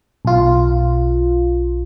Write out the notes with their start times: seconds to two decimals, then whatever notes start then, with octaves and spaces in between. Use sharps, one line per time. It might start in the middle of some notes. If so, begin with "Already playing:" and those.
0.25 B1 F4